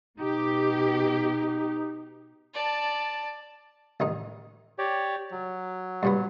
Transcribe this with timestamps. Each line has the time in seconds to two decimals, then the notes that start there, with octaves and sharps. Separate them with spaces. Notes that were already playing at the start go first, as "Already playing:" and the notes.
0.19 B2 D#4 G4
2.53 D5 A5
4.00 A1 D#3 D#4
4.79 G4 C#5 D5
5.32 F#3
6.03 G2 A#2 B3